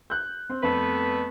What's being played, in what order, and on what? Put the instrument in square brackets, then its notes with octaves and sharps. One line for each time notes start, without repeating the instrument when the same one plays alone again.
[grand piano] F#6 G6
C4
[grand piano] F2 [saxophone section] A3 B3 B4